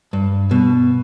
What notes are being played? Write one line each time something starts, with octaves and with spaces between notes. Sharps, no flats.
G2
B2